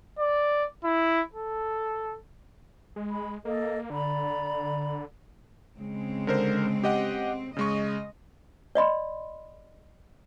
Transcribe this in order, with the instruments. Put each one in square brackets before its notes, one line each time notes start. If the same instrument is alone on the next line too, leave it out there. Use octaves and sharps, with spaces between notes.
[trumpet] D5
E4
A4
[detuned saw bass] G#3
[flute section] B5
[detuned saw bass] A#3 [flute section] A4 D#5
[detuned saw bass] D3 [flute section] D5 A#5 B5
[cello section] C#3 G#3 C4
[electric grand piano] D3 A#4 C5
G4 D#5 F#5
[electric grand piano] C#3 G#3 C#6 [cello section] D#5
[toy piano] D5 D#5 B5 C6